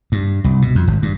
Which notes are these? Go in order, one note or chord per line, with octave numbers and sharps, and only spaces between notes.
G2
C2
B2
F2
G#1
G2